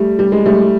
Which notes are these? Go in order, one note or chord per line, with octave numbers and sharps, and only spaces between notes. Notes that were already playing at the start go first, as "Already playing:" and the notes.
Already playing: G3 A3
G3
G#3
G3 A3